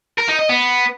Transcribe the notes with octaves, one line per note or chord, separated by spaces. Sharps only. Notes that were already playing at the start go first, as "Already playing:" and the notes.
A#4
D#4
D#5
B3